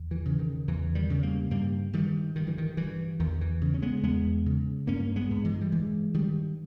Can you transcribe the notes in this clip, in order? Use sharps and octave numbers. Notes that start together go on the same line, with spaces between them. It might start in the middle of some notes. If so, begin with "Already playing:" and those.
Already playing: E2
E3
C#3
D#3
E2 E3
D#3 G3
C#3
G3 A#3
G2 G3 A#3
G2 D#3 G3
G2 D#3
E3
D#3
G2 E3
E2 D#3
E3
C#3
C#4
G#3 B3
E2 G#3 B3
C#3
G2 A#3 C#4
G#3 B3
G2
E3 G#3
G3
G2 E3 G#3
G2 D#3 G3